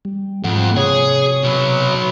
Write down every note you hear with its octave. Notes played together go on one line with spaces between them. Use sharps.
G3
F2 G#2 F#5
C3 G#4 C#5
B2 F#3